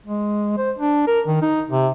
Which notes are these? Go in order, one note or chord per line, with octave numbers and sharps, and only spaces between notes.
G#3
C5
D4
A#4
D#3
D#4
C3